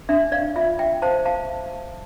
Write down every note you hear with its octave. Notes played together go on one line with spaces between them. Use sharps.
D4 E5
D5 F5
F4 E5
E5 G5
C5 F5 A5
F5 A5